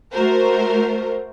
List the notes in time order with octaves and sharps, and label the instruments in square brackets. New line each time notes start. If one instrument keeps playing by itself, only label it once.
[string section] A3 F#4 A#4 C5